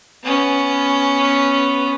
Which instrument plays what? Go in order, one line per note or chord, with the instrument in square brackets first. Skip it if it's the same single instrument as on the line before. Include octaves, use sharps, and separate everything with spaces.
[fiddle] B3 C#4